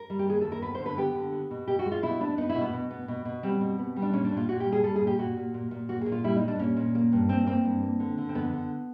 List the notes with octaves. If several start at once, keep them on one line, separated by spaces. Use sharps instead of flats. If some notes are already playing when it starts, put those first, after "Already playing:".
Already playing: A#4
G3
G4
D#2 G#4
D#2 A4
A#4
B3 B4
D3 C5
B4
B3 G4
D3
B3
B2
B2 G4
F#4
G#3
F4
B2 E4
B3 D4
B3 D#4
E4
B2
B3
B2
B3
B2
B2
G3 C4
B2
B3
G3
D4
A#2 C#4
D4
A#2
F4
A#2 F#4
G4
G3
G#4
G3 A4
G#4
A#2
G4
A#2 F#4
A#2
A#2
A#2
A#3 F#4
A#2 G#4
F4
G3 E4
D#4
G3
D4
A#2 C#4
A#2
A#3
G2
A#3 C4
A#3 C4
G2
A#3
D3
D3
C4
F2 B3
D3